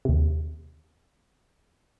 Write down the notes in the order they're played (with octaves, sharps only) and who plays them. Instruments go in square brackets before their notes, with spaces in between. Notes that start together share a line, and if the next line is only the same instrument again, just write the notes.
[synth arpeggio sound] D#2 C3